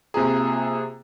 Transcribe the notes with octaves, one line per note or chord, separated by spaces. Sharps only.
C3 A#3 F4 G#4 A#5